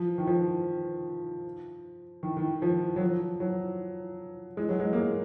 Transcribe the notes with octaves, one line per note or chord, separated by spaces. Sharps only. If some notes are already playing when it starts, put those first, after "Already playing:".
Already playing: F3
D#3
F3
D#3
D#3
F3
F#3
F3
F#3
G#3
F#3
G#3
A#3
G#3